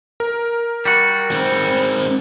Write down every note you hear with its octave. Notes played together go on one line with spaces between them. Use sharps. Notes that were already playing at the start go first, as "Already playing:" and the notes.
A#4
G3 F#4
G#2 C4